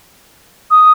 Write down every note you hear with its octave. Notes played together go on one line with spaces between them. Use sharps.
D#6